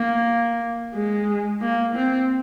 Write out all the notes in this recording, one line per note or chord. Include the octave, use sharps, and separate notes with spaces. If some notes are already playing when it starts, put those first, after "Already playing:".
Already playing: A#3
G#3
A#3
C4